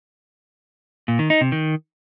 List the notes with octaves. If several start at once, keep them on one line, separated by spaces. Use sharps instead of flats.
A#2
D#3
D#4
C3
D#3